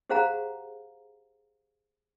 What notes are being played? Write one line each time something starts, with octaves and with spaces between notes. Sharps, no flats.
G4 G#4 C5 F5 F#5 A#5